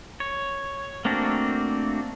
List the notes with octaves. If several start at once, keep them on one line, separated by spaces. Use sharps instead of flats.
C#5
A3 A#3 C4 D4 F#4